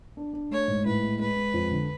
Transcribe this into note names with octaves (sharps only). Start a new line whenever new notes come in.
D4
D4
A3 C#5
G#2
A2 B4
G#3
G#3 B4
G#3
F2
D3